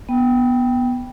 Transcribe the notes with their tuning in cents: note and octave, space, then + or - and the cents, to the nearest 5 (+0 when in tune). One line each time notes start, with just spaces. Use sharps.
B3 -10 G5 +0